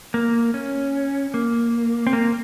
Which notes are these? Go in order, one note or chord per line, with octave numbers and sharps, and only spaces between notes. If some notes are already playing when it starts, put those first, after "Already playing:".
A#3
C#4
A#3
C4
A#3